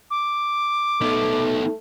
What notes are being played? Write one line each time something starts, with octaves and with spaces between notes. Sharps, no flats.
D6
A3 B3 D#4